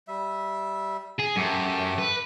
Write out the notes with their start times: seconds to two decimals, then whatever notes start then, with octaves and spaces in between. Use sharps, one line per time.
0.08 G3 E5
1.19 G#4
1.37 F#2 A3 G4 A4
1.98 B4